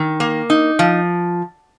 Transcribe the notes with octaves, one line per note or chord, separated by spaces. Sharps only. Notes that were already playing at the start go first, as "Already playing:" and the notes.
Already playing: D#3
A#3
D#4
F3